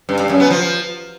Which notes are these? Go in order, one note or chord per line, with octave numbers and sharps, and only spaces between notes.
G2
G2
F#2
B3
F3